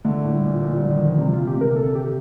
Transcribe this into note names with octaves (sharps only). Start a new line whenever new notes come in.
D3 A3
A2
G3
A#2
A#2 F3
D3 G3
D#3 G3
F3
C3 G3
F4
A#2
G4
C3 A#4
A4
G4